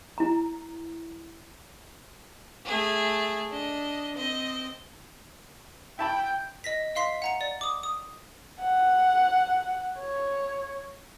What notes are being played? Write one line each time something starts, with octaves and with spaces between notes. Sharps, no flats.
E4 A#5
A3 G#4
D4 D#5
C4 D#5
E4 G5 A5 B5
D#5 A#6 B6
D#5 F5 C6 B6 C7
F#5 A#5 C#7
D5
D6 D#6
D#6
F#5
C#5